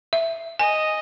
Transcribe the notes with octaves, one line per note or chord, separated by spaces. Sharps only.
E5
D#5 G#5